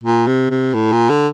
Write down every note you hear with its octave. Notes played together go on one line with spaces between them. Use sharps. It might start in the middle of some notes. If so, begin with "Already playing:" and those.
A#2
C3
C3
A2
A#2
D3